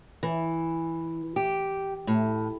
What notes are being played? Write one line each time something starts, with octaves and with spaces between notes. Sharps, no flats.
E3
G4
A2